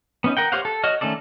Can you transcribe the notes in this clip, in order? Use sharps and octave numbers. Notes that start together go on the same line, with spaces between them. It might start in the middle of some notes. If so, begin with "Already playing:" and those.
B3 C#4 D#4
A#4 F#5 G5
G4 C5 C#5 F5 F#5
A4
F#4 C#5 D#5 F6
D#3 A3 C#4 A4 D5